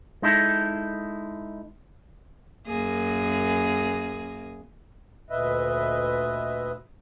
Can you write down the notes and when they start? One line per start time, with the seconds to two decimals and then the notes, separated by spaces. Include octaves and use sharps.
0.22 G#3 D#4 E4 A4
2.67 F#2 A#3 G#4
5.30 D2 A#2 B4 D#5 E5